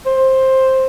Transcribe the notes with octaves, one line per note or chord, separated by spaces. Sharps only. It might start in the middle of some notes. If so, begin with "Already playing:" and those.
C5